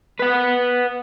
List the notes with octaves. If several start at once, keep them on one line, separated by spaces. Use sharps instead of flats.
B4 F#5